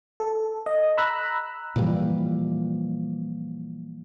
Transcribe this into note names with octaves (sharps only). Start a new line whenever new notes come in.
A4
D#5
A#5 B5 E6 F#6
A#2 E3 F3 G3